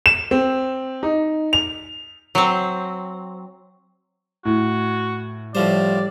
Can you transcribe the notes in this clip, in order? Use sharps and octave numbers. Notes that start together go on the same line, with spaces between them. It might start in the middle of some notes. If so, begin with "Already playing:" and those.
E7
C4
D#4
F7
F#3 C4
A2 F#4
A2 F3 G3 C5 D5